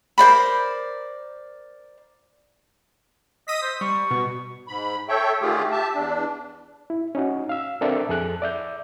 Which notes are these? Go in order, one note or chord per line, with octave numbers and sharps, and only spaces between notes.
A#4 C5 D5 B5
D#5 D#6 E6 B6
C5
G3 C#6
B2
G#2 B5
A4 C#5 E5 G5
D3 D#3 A3 F4 G4 G#4
G4 E5 A5
E2 D4
E4
C#4 D#4 F#4
F5 E6
C4 D4 A4 A#4 D5 E5
F2 G#4 A4 F#6
D5 E5 G6